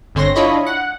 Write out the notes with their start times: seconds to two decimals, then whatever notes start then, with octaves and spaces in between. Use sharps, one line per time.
0.15 G1 D3 C4 C#5 C6 A#6
0.36 D4 E4 F4 C#5 D#5 B5
0.67 F#5